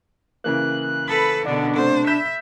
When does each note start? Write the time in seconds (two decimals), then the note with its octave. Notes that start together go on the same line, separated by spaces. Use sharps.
0.44 C#3 E3 A#3 F#6
1.08 A4 B4 B5
1.46 B2 D3 D4
1.76 C3 A3 C5
2.07 E5 B5 G6 E7